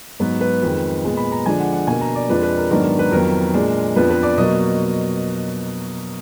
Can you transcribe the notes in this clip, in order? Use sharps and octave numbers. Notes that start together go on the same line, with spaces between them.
G#2 F#3 B3 B4
B4
F2 D#3 G#3
A#2 G#3 B3
B5
A#5
D3 F3 G#3 D4 G#5
F#5
F#5
B2 A#3 D4 G#5
A#5
D5
F2 F3 G#3 D4 B4
B4
A#4
G#2 D#3 F#3 B3 D4 A#4
A#4
B4
F2 D#3 F#3 B3 A#4
A#2 G#3 D4
F2 F3 B3 D4 B4
B4
D5
B2 F#3 A#3 D#5